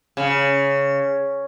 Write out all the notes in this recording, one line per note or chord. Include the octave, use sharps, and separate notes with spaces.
C#3